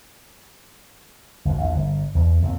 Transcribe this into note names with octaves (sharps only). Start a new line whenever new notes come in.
G1 F2
A#1 E2
G1
E2
F2 A#2 B3 C4